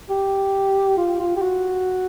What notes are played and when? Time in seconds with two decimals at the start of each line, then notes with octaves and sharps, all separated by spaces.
0.10 G4
0.97 F4
1.20 F4
1.36 G4
1.42 F#4